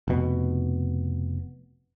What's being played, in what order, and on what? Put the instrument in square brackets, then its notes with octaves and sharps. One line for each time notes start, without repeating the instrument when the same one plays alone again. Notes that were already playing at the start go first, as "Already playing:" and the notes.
[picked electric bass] F1 B2